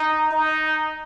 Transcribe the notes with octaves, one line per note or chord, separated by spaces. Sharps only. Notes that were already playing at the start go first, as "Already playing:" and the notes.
Already playing: D#4
D#4